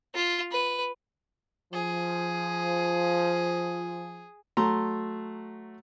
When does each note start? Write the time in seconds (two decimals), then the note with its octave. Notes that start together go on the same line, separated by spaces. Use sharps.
0.14 F4
0.51 B4
1.73 F3 G#4
4.57 F#3 A3 A#5 C6